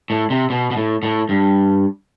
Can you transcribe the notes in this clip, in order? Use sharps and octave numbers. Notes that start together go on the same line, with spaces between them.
A2
C3
B2
B2
A2
A2
G2